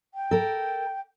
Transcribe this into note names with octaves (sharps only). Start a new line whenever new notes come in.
G5
A4 A#4